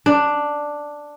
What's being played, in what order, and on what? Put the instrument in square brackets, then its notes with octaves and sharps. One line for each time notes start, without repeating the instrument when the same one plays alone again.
[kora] D4